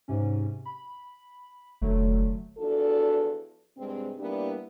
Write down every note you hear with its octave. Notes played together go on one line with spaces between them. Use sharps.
G#2 C3 C#4
B5
F1 D3 F#3 A3
E2 F3 D4 F#4 A4
G2 C3 G#3 C4
G3 A#3 B3 D4 E4 G4